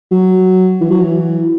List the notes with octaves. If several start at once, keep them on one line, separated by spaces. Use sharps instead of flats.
F#3
E3
F#3
E3